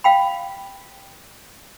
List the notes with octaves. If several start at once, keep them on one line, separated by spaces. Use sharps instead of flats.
F5 G5 B5